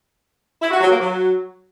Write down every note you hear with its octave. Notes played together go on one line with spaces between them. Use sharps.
E4
F#4
F#3
A#3
F#3